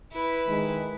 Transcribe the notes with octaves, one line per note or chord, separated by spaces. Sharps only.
E4 B4
D#3 G#3